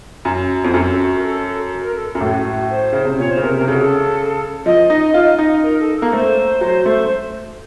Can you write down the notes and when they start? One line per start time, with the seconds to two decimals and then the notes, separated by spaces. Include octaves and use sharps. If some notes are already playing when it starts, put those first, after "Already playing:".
0.25 F#2
0.64 F2
0.69 F#4
0.74 F#2 A4
0.99 F#4
1.17 A#4
1.23 A4
1.84 A#4
1.96 A4
2.15 F#2
2.21 A2 A4
2.29 F#4
2.45 F#4
2.70 C5
2.93 C#3
3.05 C3
3.19 A#2 C#5
3.31 C5
3.37 C#3
3.42 C3 A#4
3.55 A#4
3.61 C3
3.68 C#3 A4
3.74 F#4
3.81 A4
4.66 F3 D#5
4.90 D#4
5.14 F4
5.39 D#4
5.63 A#4
5.80 A4
5.96 A4
6.02 A#3
6.12 A3 C5
6.61 F#3
6.86 A3